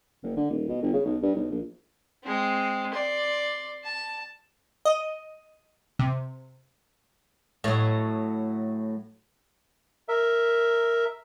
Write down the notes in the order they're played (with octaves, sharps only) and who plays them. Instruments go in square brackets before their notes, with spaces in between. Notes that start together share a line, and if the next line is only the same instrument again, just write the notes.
[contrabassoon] F#1
D3
D#1
B2
G1
C#3
B1
G2
B1
A#1
[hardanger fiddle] G#3 C4
D5 C6
A5
[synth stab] D#5
C3
[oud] A2 F#3
[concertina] A#4 E5